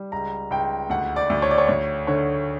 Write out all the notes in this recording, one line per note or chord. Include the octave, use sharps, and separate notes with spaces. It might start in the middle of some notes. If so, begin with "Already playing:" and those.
Already playing: G3
C#2 A#5
C#2 G5
D2 F#5
D5
D2
C#5
D5
C#5
D2 C#5
D3 C#5